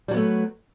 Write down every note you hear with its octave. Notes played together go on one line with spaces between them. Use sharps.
F#3 G3 A3 B3